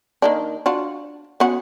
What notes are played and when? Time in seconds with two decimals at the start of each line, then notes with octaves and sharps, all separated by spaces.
0.22 D#3 A#3 D4
0.66 D4 F4 F#4
1.40 B3 C#4 F#4